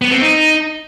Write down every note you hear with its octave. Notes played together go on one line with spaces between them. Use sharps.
B3
C4
D#4